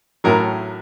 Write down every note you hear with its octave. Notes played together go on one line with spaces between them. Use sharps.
A1 A2 F#3 A#4